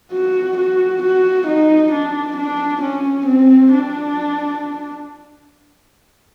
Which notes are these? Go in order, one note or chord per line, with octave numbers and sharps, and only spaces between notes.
F#4
F#4
F#4
D#4
D4
D4
C#4
C4
D4